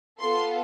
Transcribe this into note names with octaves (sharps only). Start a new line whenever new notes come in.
B3 F4 A4 C6